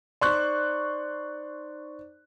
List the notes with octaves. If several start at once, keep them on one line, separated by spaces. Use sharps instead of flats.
D#4 C5 D5 C6 C#6 F#6